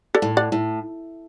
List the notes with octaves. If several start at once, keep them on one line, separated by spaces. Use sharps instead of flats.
A4 D5
A2
D5 F#5
A2